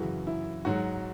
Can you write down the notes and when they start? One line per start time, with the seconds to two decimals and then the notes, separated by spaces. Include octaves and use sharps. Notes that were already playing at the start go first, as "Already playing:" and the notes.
Already playing: F#2 C#3 E3 F#4
0.27 E4
0.65 G#2 F#3 F#4